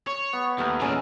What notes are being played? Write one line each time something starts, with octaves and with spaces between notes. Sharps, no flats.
C#5
B3
D#2 A3 B3 A#4
E2 A#2 G#3 C#4 A4